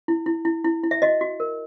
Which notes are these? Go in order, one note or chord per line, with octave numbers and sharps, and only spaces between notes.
E4
E4
E4
E4
E4
E5
F#4 D#5
F#4
A#4